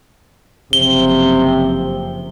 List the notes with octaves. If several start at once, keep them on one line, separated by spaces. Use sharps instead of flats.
F#1 C3 F3 G7